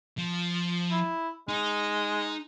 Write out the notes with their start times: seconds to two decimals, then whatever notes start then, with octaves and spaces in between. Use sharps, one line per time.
0.18 F3
0.91 E4
1.49 G#3 D#4